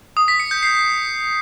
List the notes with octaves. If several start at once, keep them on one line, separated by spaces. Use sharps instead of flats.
D#6
B6
C#7
G6
C7